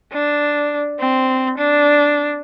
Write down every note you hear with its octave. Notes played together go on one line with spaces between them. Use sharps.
D4
C4
D4